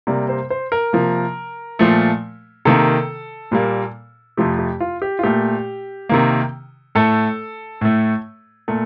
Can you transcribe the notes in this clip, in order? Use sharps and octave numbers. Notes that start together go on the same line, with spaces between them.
C3 G3 A#3 D5
C5
C5
A#4
C3 F3 A#3
A#2 F3 A3
C3 D#3 A#3 A4
A#2 G3 A#3
F2 C3 F3 A3 G4
G4
F4
G4
F4
A#2 A3 G4
C3 D#3 A#3
A2 A3 A4
A2 A3
A#2 A3 A4